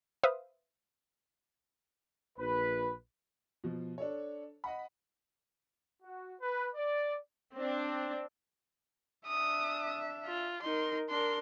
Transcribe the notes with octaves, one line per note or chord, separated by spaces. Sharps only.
B4 C5 E5 F5 D#6
A#1 B4
B2 F3
D4 A4 C#5
D#5 F#5 B5
F#4
B4
D5
C4 D4
D4 E5 D#6
F4
D#4 A#4 C6
D4 A#4 C6